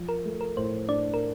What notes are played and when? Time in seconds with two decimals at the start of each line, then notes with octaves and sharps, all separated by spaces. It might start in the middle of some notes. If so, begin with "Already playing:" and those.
Already playing: F3
0.09 A#4
0.25 A3
0.41 A#4
0.57 A2 C5
0.88 D4 D5
1.14 A#4